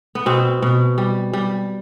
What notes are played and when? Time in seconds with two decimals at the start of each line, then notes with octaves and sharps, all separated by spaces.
0.15 B3
0.26 B2 C4
0.62 B2
0.98 G3
1.33 G3